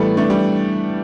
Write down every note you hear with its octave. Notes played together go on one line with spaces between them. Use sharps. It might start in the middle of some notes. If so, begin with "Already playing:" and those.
Already playing: A2 E3 G3 A3 B3
A3 D4
G3